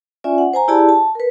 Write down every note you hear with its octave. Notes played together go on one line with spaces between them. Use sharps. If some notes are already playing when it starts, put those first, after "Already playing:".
C#4 F4 D5 E5 G#5
F#5
C5 G#5 A#5
E4 G4 G#4 D5 A5 B5
A5
A#4 B4